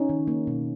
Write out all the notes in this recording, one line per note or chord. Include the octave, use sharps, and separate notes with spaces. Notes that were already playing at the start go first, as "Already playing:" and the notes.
Already playing: C#4 D#4
D#3
A#3
B2